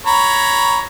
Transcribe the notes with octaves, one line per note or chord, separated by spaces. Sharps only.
C#5 A#5 B5